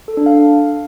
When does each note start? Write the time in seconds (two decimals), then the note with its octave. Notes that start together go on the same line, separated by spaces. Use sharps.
0.08 A4
0.17 D4
0.26 F5